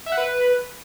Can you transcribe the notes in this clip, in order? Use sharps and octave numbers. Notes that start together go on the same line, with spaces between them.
E5
F#5
B4